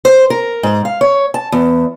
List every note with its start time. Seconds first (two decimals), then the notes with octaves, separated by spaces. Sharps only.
0.05 C5
0.30 A#4
0.63 G#2
0.85 F5
1.01 C#5
1.34 A5
1.52 E2